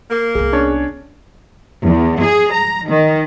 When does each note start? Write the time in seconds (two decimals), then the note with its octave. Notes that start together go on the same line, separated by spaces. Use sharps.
0.10 A#3
0.35 C2 B3 G#4
0.53 C#4 D4 C#5
1.83 E2
2.18 G#4
2.51 A#5
2.86 D#3